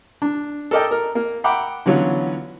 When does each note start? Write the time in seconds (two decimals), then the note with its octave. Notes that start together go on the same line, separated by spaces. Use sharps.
0.22 D4
0.71 A4 A#4 D5 D#5 G5
0.91 A#4
1.15 A#3
1.44 E5 F#5 G5 A#5 B5 D6
1.86 D3 E3 F#3 B3 C#4 F4